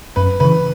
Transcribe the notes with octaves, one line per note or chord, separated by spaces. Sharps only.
F#2 B4
C#3 E3 B4